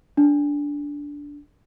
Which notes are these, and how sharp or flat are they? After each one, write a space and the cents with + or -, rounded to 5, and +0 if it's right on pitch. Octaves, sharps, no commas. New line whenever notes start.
D4 -15